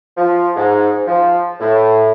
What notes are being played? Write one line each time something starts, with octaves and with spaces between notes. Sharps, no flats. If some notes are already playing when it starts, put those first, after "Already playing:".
F3
G#2
F3
A2